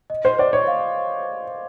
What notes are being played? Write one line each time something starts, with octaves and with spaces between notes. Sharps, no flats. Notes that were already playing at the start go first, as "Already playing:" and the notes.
D#5
C5
C5 D5
C#5
F5